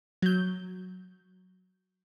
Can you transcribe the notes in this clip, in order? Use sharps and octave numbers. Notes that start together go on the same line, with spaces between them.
F#3 G6